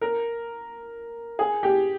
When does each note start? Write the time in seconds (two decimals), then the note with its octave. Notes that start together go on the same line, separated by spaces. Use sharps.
0.01 A#4
1.39 G#4
1.63 G4